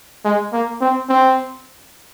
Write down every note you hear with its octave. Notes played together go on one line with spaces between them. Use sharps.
G#3
A#3
C4
C4